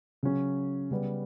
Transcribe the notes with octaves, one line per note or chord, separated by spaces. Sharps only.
C#3 F#3 C#4
C#3 G3 B3